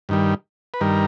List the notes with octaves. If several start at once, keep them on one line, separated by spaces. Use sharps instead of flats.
G2 D#3 G3
B4
G2 D#3 G3 A#4